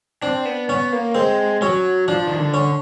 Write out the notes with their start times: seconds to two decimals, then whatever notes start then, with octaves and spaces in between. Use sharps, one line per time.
0.22 C4 D4
0.45 B3
0.69 B3 C#4
0.93 A#3
1.15 G#3 C4
1.62 F#3 C#4
2.08 F3 D4
2.27 D#3
2.39 D3
2.54 C#4